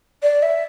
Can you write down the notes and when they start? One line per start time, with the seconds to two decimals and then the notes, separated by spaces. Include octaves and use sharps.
0.23 D5
0.42 E5